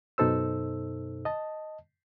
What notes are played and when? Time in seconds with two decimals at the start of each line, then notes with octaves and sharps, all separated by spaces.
0.18 F#2 B2 D#4 A4 C5 E6
1.25 D#5 A5